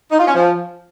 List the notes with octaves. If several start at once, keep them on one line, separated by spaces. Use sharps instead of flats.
D#4
F4
C#4
F3